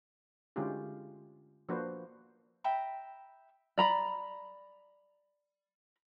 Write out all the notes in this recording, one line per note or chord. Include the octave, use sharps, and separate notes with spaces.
D3 G#3 C#4 E4 F4 G4
F3 A#3 D4 F#4 B4 C5
E5 G5 A#5 B5
D5 A#5 B5